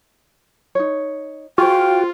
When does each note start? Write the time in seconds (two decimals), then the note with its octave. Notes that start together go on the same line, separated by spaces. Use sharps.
0.75 D#4 C#5
1.58 F4 F#4 G#4 C5 G5